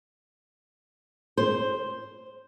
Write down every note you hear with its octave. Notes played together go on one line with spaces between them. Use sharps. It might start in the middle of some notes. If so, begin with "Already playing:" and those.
C5